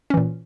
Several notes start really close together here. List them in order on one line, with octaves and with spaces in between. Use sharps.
C#4 E3 A#2